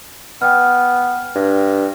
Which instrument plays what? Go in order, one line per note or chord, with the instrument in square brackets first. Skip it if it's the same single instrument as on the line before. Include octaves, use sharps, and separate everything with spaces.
[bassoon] B3 [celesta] G5 F6
[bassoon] G2